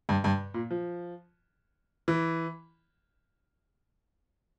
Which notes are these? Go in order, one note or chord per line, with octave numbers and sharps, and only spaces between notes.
G2
G2
A#2
F3
E3